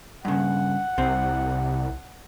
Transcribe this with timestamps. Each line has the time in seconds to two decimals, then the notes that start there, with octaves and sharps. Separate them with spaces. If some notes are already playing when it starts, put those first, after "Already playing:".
0.25 G2 C#3 F#5
0.98 C2 C3 C4